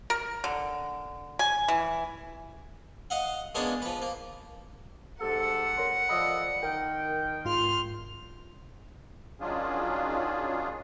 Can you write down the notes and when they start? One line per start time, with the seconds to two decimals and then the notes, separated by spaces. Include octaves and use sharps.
0.10 A#4
0.44 D3
1.39 G#5
1.68 E3
3.10 D#5 F5 F#5
3.55 G#3 A#3 B3 C#4 D4
3.82 F3 B4
4.02 A#3
5.20 G#2 C3 A4 F#5
5.77 A#4 C#5 C6
6.09 F3 A4 D5 D#5 B5
6.63 D#3 A#4 G5
7.45 G#2 F4 C6 F6
9.40 D#3 F#3 C#4 D4 F4 G#4